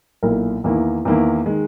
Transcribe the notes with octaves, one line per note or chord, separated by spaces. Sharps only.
B1 A#2 A#3 E4 A#4
E2 D#3 A#3 E4
E2 D#3 A#3 E4
D#3 G#3